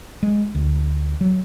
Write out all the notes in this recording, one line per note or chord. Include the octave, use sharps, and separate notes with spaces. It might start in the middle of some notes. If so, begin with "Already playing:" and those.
G#3
D2
F#3